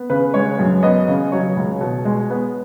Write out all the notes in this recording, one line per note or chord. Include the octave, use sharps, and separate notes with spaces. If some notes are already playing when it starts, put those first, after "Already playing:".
Already playing: B3
C#3 B4
G#3 C#5
F#2
B3 D#5
C#3
F#3 C#5
C#2
B2
G#3
B3